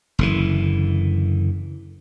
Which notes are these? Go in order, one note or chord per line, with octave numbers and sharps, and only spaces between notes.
F#1 D3 E3